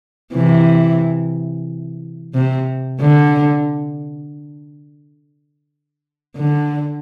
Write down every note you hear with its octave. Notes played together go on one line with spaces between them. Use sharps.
C3 E3
C3
D3
D3